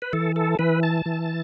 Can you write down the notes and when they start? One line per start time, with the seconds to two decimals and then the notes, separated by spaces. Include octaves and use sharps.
0.02 B4
0.13 E3 A4
0.36 A4
0.59 E3 B4
0.83 A5
1.06 E3